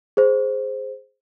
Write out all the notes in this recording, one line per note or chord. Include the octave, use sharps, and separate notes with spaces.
G#4 C5